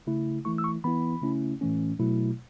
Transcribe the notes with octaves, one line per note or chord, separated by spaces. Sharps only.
C#3 A3 E4
E3 A3 E4 C#6
E6
C#6
E3 B3 E4 B5
C#3 A3 C#4 E4
A2 E3 A3 C#4
B2 F#3 A3 E4